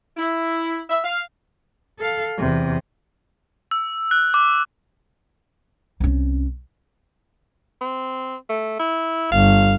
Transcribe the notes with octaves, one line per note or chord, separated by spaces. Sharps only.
E4
E5
F5
A4 F5
E2 C3
E6
F#6
D6
C2 C#4
C4
A3
E4
G1 F5